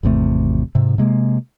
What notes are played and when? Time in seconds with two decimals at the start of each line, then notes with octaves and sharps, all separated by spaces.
0.03 G#1 E2 C3 A3
0.75 G#2 C3
0.98 C3 G#3 A#3